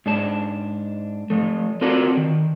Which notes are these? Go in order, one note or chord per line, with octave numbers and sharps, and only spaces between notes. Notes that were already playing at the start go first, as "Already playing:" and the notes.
G#2 D4 A5
F3 A3
C4 F4 F#4 A4 A#4 D5
D#3